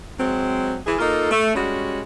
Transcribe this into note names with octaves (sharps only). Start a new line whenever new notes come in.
F#3 G#3 C4
E3 G#4
A#3 D#4 F4 A4
A3
G3 G#3 C#4 F#4